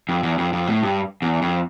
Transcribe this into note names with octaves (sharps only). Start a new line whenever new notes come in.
F2
E2
F2
F2
A2
G2
E2
F2